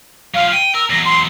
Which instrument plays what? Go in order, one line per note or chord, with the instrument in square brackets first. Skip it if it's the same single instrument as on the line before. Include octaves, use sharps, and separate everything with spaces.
[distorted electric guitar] F#3 F4 [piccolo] F5
[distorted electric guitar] G5 [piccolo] D#7
[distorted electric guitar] A#4 [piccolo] E6
[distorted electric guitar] E2 F#3 [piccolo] A#6
[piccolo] C6